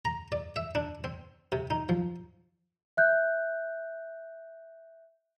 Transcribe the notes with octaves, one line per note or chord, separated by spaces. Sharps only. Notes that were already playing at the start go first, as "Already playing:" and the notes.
A#5
D5
E5
D4
C4
C3
D#4
F3
E5 F#6 G6